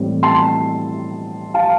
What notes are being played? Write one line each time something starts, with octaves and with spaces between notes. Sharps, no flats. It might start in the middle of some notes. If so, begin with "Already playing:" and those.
Already playing: A2 E3 G3 C4
A5 C6
F5 A5